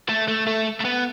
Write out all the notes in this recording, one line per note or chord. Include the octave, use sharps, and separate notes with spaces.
A3
A3
A3
A3
B3